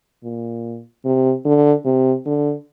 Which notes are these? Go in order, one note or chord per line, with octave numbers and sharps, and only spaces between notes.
A#2
C3
D3
C3
D3